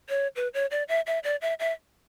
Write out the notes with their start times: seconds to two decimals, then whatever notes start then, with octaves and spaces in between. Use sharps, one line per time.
0.09 C#5
0.36 B4
0.54 C#5
0.71 D5
0.88 E5
1.07 E5
1.24 D5
1.42 E5
1.60 E5